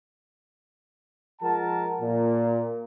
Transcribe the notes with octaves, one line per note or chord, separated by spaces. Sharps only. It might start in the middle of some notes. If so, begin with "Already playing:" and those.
F3 G#3 A#4 F#5 A5
A#2